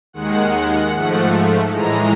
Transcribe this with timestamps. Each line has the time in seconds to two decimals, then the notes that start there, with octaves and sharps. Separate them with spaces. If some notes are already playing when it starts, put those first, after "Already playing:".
0.13 D#2 D#3 G#3 F#5
0.92 G#2 F3 A3
1.71 A2 E3 G#3 A#5